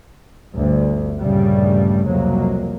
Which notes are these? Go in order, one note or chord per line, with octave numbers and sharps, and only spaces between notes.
G1 D2
A#1 G2 C#3 G3 A3
C2 F2 F#3 A#3